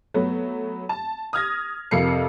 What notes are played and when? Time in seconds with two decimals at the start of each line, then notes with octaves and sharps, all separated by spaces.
0.14 F#3 A3 B3
0.89 A5
1.33 D#6 F6 G#6 A#6
1.91 F2 C3 A#4 F5 C7 C#7